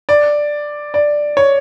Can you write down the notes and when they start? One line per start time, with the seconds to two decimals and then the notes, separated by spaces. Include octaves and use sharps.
0.09 D5
0.94 D5
1.37 C#5